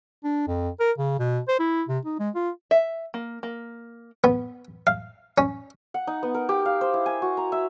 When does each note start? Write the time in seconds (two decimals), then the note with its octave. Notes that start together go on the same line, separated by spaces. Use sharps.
0.24 D4
0.47 F2
0.80 A#4
0.98 C#3
1.19 B2
1.48 C5
1.59 E4
1.88 C3
2.05 D#4
2.19 G#3
2.35 F4
2.71 E5
3.14 A#3
3.43 A#3
4.24 B3
4.87 F5
5.38 C#4
5.94 F#5
6.07 D#4
6.23 B3
6.34 A#4
6.49 G4
6.65 F5
6.81 C5
6.94 E4
7.06 G#5
7.22 F#4
7.37 A#5
7.52 E5